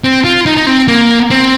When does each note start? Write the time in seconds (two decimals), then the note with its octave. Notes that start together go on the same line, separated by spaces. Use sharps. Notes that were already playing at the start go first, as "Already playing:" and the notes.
0.04 C4
0.25 F4
0.46 D#4
0.57 D#4
0.67 C4
0.88 A#3
1.31 C4